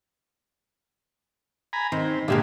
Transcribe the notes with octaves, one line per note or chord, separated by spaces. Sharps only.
G#5 A#5 B5
D#3 C4
A#2 D3 G#3 A#3 G4 E5